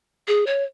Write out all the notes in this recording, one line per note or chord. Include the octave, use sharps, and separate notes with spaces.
G#4
C#5